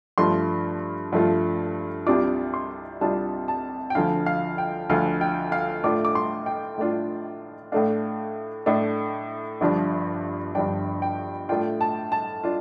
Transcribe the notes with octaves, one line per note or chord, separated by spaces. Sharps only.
G2 F3 A3 F4 C6
G2 F3 A3 F4
C2 C3 G3 D4 F4 D6
C6
C2 C3 G3 D4 F4 A5
A5
G5
D2 D3 F3 F5
F5
G5
D2 D3 F3 F5
G5
F5
A2 A3 D4 F4 D6
D6
C6
G5
A2 A3 D4 F4
A2 A3 D4 F5
A2 A3 D4
G1 G2 F3 D4
G1 G2 F3 D4 G5
G5
A2 A3 D4 F4 G5
A5
A5
D4 F4